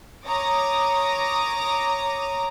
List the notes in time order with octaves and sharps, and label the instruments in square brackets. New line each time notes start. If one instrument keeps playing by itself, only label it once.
[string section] C#5 A#5 D6 D#6 A#6